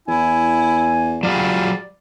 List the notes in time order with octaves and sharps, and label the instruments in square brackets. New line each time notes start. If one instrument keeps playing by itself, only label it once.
[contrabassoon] E2 [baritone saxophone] E4 [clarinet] G#5
[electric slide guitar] F#3 F4 G#4 [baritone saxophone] G3 [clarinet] D5